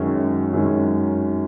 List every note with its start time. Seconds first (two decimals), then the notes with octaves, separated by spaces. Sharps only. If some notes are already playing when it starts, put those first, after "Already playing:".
Already playing: F#2 D#3 G#3 C#4
0.53 F#2 D#3 G#3 C#4